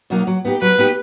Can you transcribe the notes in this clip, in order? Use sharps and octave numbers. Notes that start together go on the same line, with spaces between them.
B2 F#3 A#3 D#4
F#3
B3 D#4 G4
F#3 B4
B3 D#4 G4